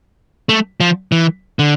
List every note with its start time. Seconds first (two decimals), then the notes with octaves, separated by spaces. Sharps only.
0.49 A3
0.80 F3
1.12 E3
1.59 D3